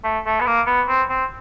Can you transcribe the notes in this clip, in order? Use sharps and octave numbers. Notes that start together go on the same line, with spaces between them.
A3
A3
B3
A#3
B3
C4
C4